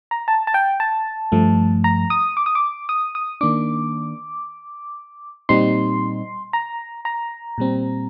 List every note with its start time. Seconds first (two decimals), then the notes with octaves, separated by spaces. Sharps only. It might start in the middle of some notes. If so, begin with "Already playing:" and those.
0.11 A#5
0.28 A5
0.47 A5
0.54 G5
0.80 A5
1.32 G2 F3 A3
1.84 A#5
2.10 D#6
2.37 D6
2.46 D#6
2.55 D6
2.89 D#6
3.15 D#6
3.41 D#3 A#3 D4 D6
5.49 A#2 G3 C4 D#4 C6
6.53 A#5
7.05 A#5
7.58 A#2 G3 C4